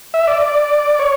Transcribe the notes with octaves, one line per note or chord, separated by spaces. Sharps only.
E5
D5
D5
C#5